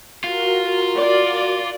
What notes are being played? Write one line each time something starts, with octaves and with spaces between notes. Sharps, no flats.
F4 F#4 A#4
D5